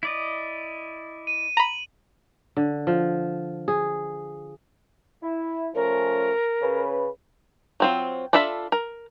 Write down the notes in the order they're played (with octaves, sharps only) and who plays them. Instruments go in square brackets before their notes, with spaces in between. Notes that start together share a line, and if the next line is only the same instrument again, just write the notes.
[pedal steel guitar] E4 D5 D#5
[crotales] D#7
[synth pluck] A#5 B5 [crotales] F#7
[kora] D3
F3
G#4
[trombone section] E4
[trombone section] F3 A3 C#4 [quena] A#4
[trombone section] C#3 C#4 B4
[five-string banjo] F#3 C4 F4
D4 F4 A4 E5 B5
A#4